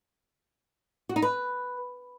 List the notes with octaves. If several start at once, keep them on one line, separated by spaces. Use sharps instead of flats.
F#4
D#4
B4